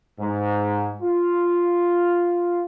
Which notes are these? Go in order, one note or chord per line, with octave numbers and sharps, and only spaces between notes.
G#2
F4